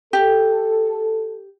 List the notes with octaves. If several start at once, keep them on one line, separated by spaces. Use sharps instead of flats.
G4 A4